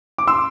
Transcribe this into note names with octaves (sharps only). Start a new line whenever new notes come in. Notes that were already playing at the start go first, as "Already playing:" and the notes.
D6
C6 E6